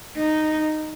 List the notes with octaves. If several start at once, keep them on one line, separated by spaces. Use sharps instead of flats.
D#4